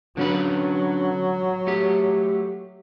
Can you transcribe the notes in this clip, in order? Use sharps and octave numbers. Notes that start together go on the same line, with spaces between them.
D3 F#3 C#4 B4
A3 G4